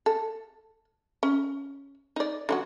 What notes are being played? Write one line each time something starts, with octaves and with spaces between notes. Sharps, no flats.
A4
C#4
D#4 D5
D3 F#3 F#4